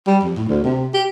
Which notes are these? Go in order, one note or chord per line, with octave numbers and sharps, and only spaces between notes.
G3
F2
A2
D2
C3
G4